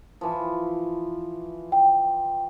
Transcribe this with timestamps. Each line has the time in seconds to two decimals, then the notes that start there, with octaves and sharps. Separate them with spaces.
0.21 E3 F3
1.72 G5